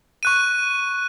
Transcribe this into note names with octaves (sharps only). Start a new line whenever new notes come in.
C#6 F#6 D#7